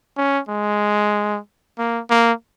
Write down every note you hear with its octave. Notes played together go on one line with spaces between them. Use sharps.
C#4
G#3
A#3
A#3